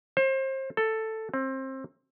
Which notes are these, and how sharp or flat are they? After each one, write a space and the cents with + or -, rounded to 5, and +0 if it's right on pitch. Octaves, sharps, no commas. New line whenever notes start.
C5 +30
A4 +5
C4 +25